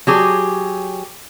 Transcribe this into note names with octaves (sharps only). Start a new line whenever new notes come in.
F#3 G4 G#4